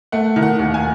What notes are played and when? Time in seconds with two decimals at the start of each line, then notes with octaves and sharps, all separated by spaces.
0.12 A3 F#5
0.36 D#3
0.43 F#5
0.59 D#2
0.74 G#5